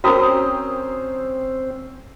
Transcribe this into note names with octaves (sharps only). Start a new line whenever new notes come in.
C4 C#4 F#4 A#4 C5 G5 A#5 D#6